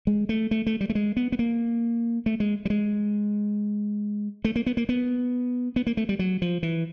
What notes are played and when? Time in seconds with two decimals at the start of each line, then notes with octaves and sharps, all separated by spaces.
0.07 G#3
0.29 A3
0.51 A3
0.66 A3
0.81 G3
0.90 A3
0.95 G#3
1.17 B3
1.32 B3
1.39 A#3
2.26 A3
2.40 G#3
2.65 G3
2.70 G#3
4.45 A3
4.56 A#3
4.66 B3
4.77 A#3
4.89 B3
5.76 B3
5.87 A#3
5.97 A3
6.09 G3
6.19 F#3
6.42 F3
6.63 E3